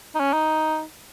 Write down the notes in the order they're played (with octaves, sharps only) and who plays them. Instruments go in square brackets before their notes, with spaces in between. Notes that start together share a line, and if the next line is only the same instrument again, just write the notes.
[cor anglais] D#4
C#4
D#4